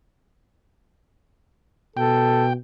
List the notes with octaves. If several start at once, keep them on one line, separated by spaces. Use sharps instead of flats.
B2 A4 G5